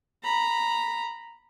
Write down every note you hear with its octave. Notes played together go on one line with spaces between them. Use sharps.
A#5 B5